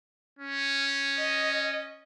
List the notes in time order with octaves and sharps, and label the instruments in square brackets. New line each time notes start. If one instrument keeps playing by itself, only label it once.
[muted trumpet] C#4
[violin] D#5